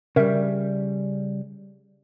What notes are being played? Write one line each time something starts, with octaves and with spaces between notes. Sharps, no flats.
C#3 G3 A#4 E5